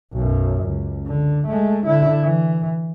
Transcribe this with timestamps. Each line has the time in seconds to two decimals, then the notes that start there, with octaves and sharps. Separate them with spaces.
0.13 B1 F#2
0.63 C#2
1.07 D3
1.47 G#3 A3
1.86 D3 E4
2.24 E3